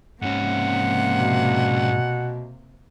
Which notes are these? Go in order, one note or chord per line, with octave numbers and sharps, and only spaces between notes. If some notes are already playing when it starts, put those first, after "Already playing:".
G#2 C3 A#3 C#4 F#5
B2